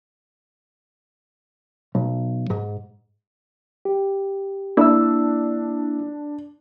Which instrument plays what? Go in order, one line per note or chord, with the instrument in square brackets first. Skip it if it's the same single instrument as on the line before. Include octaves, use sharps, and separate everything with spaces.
[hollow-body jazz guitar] B1
G#2
[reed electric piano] G4
[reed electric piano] A#3 E6 [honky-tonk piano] D4 [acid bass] E4